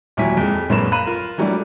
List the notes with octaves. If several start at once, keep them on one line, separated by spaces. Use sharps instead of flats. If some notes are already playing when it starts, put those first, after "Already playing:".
D#2 A#2 F#3 E4 G#5 B6
F2 G#3
A#1 F#2 A#3 B4 C#5 E7
F5 A#5 B5 F#6 D#7
F4 A#4
E3 F#3 G3 A3 D4 E4